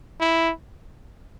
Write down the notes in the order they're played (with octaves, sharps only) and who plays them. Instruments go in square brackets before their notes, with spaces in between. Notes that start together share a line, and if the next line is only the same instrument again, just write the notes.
[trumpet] E4